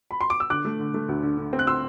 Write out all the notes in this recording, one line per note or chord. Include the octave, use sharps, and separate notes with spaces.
B5
C6
D6
E6
D3 D6 F#6
A3
D3
A3
D2
D3
D3
C4
F#6
C6 E6